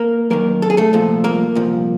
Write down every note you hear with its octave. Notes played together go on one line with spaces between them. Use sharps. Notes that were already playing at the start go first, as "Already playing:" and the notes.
Already playing: A#3 A#4
F#2 D#3 A#3 A#4
A4
G#4
A3 A4
C2 A#2 F3
A#3 A#4
C2 A#2 F3